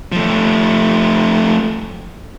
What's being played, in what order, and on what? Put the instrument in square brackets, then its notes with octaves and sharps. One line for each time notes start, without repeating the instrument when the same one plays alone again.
[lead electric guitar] F3 A3